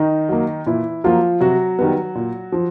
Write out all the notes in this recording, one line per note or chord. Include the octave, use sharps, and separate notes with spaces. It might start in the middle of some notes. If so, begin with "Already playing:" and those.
Already playing: D#3 D#4
F#3 A#3
A#2 E3 E4
F3 F#3 A#3 F4
C3 F#3 F#4
D#3 G3 B3
A#2
F3